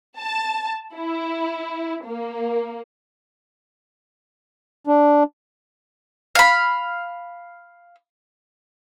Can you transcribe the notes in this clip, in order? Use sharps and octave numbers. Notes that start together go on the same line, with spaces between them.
A5
E4
A#3
D4
F5 B5